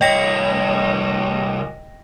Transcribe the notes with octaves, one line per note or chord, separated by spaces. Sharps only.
C2 C#5 D#5 G5 A#6